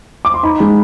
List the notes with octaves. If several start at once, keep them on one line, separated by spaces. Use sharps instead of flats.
D6
C6
D#4 B5
G#3